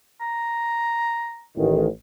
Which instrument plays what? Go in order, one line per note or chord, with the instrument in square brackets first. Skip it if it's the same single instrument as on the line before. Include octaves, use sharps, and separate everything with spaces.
[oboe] A#5
[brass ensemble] A1 D#3